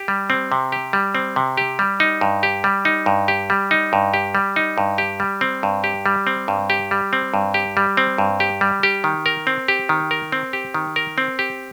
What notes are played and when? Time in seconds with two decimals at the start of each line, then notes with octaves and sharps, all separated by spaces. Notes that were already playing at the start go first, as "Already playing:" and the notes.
Already playing: G4
0.08 G3
0.30 C4
0.52 C3
0.72 G4
0.93 G3
1.15 C4
1.36 C3
1.57 G4
1.79 G3
2.00 D#4
2.21 G2
2.43 G4
2.64 G3
2.85 D#4
3.06 G2
3.28 G4
3.50 G3
3.71 D#4
3.93 G2
4.14 G4
4.35 G3
4.56 D#4
4.78 G2
4.98 G4
5.20 G3
5.41 C4
5.63 G2
5.84 G4
6.06 G3
6.27 C4
6.48 G2
6.70 G4
6.91 G3
7.13 C4
7.34 G2
7.54 G4
7.77 G3
7.97 C4
8.18 G2
8.40 G4
8.61 G3
8.83 G4
9.04 D#3
9.26 A#4
9.47 C4
9.68 G4
9.89 D#3
10.11 A#4
10.32 C4
10.53 G4
10.74 D#3
10.96 A#4
11.18 C4
11.39 G4